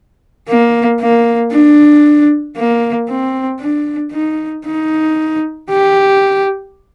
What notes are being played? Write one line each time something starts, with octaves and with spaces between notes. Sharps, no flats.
A#3
A#3
D4
A#3
C4
D4
D#4
D#4
G4